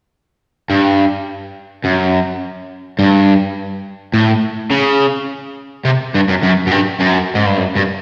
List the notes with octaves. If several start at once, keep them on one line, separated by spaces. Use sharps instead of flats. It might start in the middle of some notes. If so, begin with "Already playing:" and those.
G2
F#2
G2
A2
C#3
C3
G2
F#2
F#2
F#2
G2
F#2
G#2
G2
F#2
G2